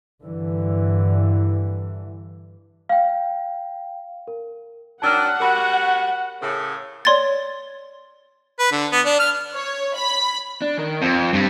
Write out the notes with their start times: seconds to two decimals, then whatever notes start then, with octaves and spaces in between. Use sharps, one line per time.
0.23 G2 D3 E3
2.89 F5 G5
4.28 A#4
5.02 D#3 F#3 D4 F#5 A5 E6 F6
5.40 G3 C#4 F#4 A#4 B5
6.41 A2 C#3 A#4
7.05 C#5 D5 C6 G#6 A6
8.59 B4
8.72 D3
8.92 B3
9.06 D4
9.19 F6
9.55 C#5
9.95 B5
10.62 D4
10.78 D#3 A#4
11.02 F2 C4
11.33 G2 G3